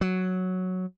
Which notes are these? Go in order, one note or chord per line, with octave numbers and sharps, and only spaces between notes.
F#3